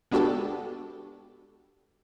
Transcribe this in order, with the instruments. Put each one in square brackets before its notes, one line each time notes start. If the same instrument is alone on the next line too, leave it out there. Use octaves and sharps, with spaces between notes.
[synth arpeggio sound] G#3 B3 D4 F#4 G4 A4